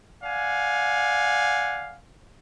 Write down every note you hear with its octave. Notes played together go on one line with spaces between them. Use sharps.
D5 F5 F#5 G#5